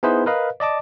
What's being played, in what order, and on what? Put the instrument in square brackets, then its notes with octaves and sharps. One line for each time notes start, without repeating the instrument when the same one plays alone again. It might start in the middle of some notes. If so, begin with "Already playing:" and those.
[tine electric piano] B3 D#4 E4 G#4 B4 C5
A#4 B4 D#5 F5
D5 D#5 A5 D6